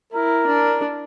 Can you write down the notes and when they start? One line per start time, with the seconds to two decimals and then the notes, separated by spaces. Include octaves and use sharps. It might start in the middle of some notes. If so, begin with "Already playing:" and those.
0.13 E4 A#4
0.47 D4